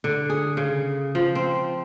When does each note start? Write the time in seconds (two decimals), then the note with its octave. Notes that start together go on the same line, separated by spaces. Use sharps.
0.04 D3
0.30 G#4
0.57 C#3
1.15 F3
1.35 C4